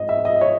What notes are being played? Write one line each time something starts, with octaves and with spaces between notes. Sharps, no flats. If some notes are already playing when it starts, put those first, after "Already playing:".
Already playing: G#2 D#5
E5
D#5
C#5